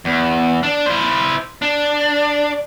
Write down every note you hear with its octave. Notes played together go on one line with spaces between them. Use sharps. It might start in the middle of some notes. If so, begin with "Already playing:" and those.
E2
D4
E4 C5
D4